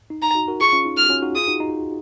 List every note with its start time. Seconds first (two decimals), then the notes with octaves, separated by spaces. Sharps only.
0.10 D#4
0.22 D#4 A#5
0.35 D#4 F#4
0.48 F#4 A#4
0.60 F4 G#4 C#6
0.73 C#4 F4
0.85 D#4
0.97 F6
1.06 F#4
1.10 C#4 F4
1.22 D#4 F#4
1.35 F4 G#4 D#6
1.48 D#4 F#4
1.60 D#4